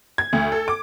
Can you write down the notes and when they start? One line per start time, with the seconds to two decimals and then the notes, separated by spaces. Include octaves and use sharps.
0.18 G#6
0.33 D2
0.52 A4
0.68 D6